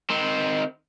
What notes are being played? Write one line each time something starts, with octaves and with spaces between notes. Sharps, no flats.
D#3 C4